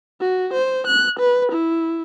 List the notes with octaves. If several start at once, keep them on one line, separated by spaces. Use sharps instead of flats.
F#4
C5
F#6
B4
E4